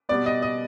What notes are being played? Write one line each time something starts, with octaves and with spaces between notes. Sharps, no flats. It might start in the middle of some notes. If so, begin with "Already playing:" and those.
B2 G3 B3 D5
D#5
D#5